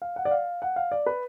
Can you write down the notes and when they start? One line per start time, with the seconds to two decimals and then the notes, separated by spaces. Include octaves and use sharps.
0.02 F5
0.16 F#5
0.25 D5
0.31 F5
0.62 F#5
0.76 F5
0.92 D5
1.06 B4